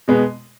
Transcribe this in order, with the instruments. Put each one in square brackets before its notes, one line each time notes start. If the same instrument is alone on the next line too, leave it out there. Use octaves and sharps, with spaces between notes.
[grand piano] B2 G#3 B3